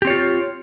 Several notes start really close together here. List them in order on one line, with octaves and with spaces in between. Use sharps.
G4 C4 C#5 F4